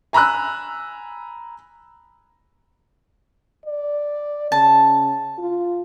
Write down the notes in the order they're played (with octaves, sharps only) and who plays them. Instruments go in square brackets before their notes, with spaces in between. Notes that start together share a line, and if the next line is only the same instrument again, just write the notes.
[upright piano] G#5 A#5 B5 E6 F#6
[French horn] D5
[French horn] C#3 [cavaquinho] A5
[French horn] F4